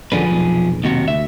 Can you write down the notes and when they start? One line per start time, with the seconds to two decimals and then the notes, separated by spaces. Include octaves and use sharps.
0.12 D#1 F#2 D3 F3 G#4 B4
0.27 F1 B1
0.84 D#2 C3 F#4
1.08 D2 E5